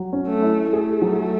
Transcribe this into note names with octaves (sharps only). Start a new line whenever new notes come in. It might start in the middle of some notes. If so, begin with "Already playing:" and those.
Already playing: F#3
C#4
A3
E4
A3 G#4
F#3